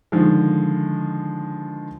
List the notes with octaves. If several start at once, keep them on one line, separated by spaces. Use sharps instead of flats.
D3 D#3 F3 G#3